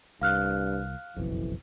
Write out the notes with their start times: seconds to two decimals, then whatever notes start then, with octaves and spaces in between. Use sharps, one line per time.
0.21 C2 G2 F5 F6 F#6
1.16 F#1 B1 F2 E3